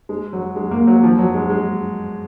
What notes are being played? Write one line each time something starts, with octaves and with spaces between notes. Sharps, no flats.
G#3
F#3
G#3
A#3
F#3
F3
F#3
G#3
G#3